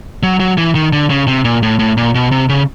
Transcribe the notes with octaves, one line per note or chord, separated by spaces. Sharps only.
F#3
F#3
E3
D#3
D3
C#3
C3
A#2
A2
A2
A#2
B2
C3
C#3